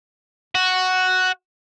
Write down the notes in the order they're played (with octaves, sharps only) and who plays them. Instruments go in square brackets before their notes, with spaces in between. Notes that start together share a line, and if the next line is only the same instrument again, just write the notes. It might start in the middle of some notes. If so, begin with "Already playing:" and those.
[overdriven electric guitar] F#4